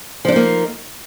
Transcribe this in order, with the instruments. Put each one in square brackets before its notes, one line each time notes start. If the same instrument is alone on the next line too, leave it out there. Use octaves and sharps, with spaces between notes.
[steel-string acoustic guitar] F3
D4
D#4
A#3